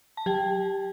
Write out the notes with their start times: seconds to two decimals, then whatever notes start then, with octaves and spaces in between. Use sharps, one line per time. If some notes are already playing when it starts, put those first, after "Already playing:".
0.17 A5
0.26 F#3 G4 G5